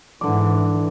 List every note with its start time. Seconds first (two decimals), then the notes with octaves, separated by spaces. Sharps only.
0.21 G#2 D3 E3 D6